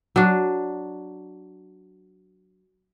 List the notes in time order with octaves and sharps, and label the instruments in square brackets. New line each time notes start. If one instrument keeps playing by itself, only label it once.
[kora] F#3 D4